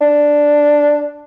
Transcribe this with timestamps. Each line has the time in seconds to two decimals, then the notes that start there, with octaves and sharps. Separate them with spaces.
0.01 D4